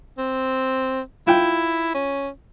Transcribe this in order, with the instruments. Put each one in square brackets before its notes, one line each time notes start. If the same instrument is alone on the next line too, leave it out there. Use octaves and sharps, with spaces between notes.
[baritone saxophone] C4
[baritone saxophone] E4 [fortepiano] F4 G5
[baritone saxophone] C#4